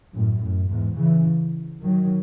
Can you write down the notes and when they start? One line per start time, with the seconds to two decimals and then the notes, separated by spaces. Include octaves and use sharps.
0.14 F#2 A2
0.41 F#2
0.70 E2 G#2
0.98 C#3 E3
1.83 D#3 F#3